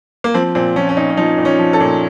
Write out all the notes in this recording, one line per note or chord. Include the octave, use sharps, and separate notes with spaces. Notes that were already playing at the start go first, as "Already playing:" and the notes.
A#3
F3 C4
A#2 C4
F3 C#4
C#4
A#2 D#4
C#4
F3 D#4
A#2
C#4
F3
A4
A#2